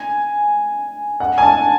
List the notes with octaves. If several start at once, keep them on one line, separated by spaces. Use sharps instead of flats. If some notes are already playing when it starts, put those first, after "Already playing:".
Already playing: G#5
F#5
G#5
A5